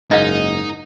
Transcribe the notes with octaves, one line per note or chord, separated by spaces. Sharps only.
F#1 G#2 A#3 D#4 D#5 F5